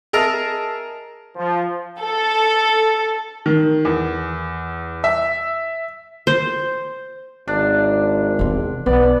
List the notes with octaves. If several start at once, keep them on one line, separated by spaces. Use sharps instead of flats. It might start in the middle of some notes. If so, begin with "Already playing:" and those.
G#4 A#4 D#5 E5 A5 A#5
F3
A4
D#3
E2
E5
C5
G#1 D4
E2 C3
B1 B3 D5